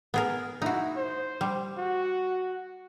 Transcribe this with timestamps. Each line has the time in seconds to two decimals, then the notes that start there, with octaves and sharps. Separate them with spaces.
0.14 B3 G#4 A#4
0.62 D#4 E4 F#4
0.96 C5
1.41 G3
1.78 F#4